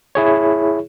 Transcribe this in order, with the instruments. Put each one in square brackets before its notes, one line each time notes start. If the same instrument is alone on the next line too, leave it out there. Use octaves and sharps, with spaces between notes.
[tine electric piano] E4 G#4 C#5